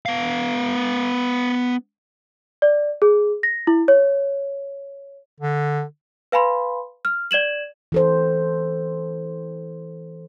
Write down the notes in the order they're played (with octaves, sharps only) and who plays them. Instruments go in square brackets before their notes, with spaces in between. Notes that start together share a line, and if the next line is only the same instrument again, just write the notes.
[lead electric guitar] B3 F5
[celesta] D5
G#4
A#6
E4
C#5
[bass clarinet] D3
[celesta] B4 F5 G#5 B5 C6
F6
D5 G#6 E7 F#7
[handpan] E3 A4 C5